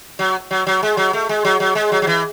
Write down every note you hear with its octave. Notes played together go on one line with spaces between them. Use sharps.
F#3
F#3
F#3
G#3
F#3
A3
G#3
F#3
F#3
G#3
F#3
F#3
E3